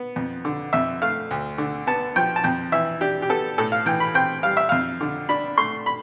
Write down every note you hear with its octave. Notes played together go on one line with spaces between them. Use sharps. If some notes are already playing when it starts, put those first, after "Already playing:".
Already playing: B3
F2
D3
F2 E5
A3 F5
D2
D3
B3 A5
F3 G5
A5
F2 G5
E3 E5
D4 G4
G4
B3 A4
A2 A4
F5
E3 G5
B5
C4 G5
G3 F5
E5
F2 F5
D3
D4 B5
A3 C6
B5